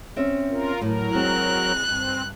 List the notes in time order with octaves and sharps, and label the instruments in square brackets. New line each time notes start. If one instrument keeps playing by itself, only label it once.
[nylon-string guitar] C4 C#4 E5
[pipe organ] F4 A#4
[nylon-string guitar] A2 [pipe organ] F#3 A#4
[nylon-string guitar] G#3 C4 [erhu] F#6
[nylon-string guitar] G2 [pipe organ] C4